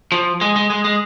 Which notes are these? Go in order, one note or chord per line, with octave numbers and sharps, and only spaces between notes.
F3
G#3
G#3
G#3
G#3